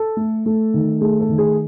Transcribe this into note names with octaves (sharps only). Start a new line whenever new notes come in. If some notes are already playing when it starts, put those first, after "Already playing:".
Already playing: A4
A3
A3
D#3
A3 G#4
A4
D#3
G#4